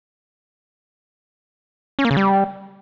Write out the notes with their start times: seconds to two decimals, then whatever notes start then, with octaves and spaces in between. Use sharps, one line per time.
1.99 C#4
2.05 A#3
2.11 C#3
2.17 G3